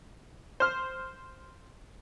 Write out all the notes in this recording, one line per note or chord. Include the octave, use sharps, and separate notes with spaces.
C5 F6